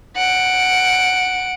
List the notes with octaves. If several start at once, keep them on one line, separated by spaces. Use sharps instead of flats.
F#5 D7